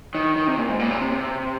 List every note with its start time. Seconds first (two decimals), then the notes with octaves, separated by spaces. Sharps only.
0.15 D#3
0.36 D#3
0.47 C3
0.58 A#2
0.69 G#2
0.79 A#2
0.91 C3
1.01 C3
1.12 C3